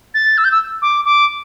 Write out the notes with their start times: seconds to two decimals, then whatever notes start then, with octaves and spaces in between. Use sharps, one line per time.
0.14 A6
0.37 E6
0.44 G6
0.51 E6
0.82 D6
1.05 D6